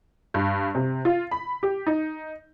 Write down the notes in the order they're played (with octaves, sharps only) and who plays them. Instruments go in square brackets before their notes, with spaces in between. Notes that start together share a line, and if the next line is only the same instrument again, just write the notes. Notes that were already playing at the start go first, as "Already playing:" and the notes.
[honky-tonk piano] G2
C3
F4
B5
G4
D#4